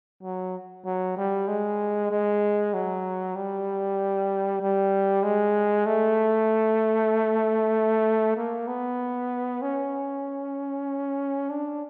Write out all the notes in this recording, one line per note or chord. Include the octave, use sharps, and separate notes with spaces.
F#3
F#3
G3
G#3
G#3
F#3
G3
G3
G#3
A3
A#3
B3
C#4
D4